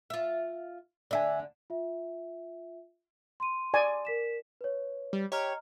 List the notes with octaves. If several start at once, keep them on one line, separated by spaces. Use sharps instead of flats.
F4 E5
D3 D4 D5 E5 G#5
F4 E5
C6 D#7
D5 G#5
A#4 B6 E7
B4 C#5
G3
G4 C#5 D#5 A#5 F6